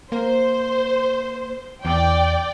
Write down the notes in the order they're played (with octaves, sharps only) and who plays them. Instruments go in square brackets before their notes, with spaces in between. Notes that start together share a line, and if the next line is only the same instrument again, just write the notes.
[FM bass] A#3 [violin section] C5
[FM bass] E2 [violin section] D5 G5